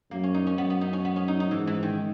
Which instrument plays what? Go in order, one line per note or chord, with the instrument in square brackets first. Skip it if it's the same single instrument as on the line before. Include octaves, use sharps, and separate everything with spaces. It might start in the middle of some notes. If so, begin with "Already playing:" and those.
[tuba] F#2 [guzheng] A#3
[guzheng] C#4
D#4
C#4
[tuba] F#2 [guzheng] B3
[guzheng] B3
D#4
C#4
B3
C#4
D#4
D#4
[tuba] G#2 [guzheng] E3
[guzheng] E3
D#3